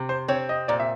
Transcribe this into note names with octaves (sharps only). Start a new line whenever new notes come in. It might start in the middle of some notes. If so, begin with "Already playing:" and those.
Already playing: C3
C5
C4 C#5
D#5
A#2 D5
E5